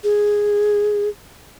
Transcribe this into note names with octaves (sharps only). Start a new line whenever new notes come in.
G#4